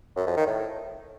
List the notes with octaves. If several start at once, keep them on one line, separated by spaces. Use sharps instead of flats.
F#2
F2
D#3
A2